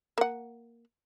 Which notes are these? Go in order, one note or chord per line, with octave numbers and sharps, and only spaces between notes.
A#3 F#5